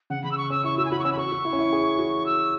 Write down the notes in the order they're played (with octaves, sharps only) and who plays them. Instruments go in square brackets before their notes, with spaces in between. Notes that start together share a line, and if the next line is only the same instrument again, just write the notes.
[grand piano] C#3 [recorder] F#5
[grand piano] C#3 [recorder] B5
[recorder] E6
C#6
[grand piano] C#4 [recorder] E6
[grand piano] E4 [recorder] C#6
[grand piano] F#4 [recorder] E6
[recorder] G#5
[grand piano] F#4 [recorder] B5
[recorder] C#6
[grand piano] C#4 [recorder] E6
[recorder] B5
[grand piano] F#4 [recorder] C#6
[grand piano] F#4
E4
C#4
E4
G#4
F#4
[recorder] E6